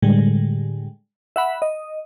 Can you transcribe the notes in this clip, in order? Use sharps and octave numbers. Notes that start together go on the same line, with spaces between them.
A2 D3 G3 G#3
E5 F#5 B5
D#5